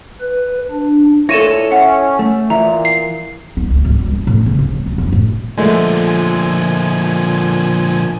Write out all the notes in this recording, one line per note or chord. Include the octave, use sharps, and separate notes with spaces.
B4
D4
D2 A#2 E4 A4 C#5 A#6 D#7 E7
C#4 E5 F#5
A3
A#2 E3 E5 A#5
C7
D#4
D2
G#1
G2
D4
A2
C#3
C4
F#3
F#2
F#2
A2
A#2 D3 F3 G#3 A3 G#5